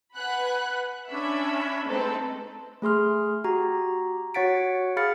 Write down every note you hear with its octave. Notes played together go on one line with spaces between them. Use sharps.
B4 F#5 G#5 B5 F#6
C#4 D4 E5 B5
G#3 A3 C4 D#4 A4 B4
A3 G#4 C6 F6
F#4 G4 A#5
F#4 C#5 F#5 A6 B6 D7
G#4 F5 B5 F6 A6 C#7